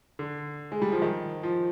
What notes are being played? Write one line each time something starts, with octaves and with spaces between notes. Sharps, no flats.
D3
G#3
G3
F3
D#3
F3